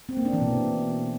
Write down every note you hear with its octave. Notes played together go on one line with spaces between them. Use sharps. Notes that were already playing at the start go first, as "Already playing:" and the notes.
C4
A#3
D4
E3
B2